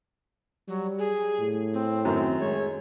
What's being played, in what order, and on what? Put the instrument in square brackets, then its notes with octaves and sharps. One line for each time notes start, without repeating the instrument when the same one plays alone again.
[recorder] F#3 [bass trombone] G3
[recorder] G#4
[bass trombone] A2
[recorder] C4
[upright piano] F#2 D#3
[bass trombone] G#3 [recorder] C#5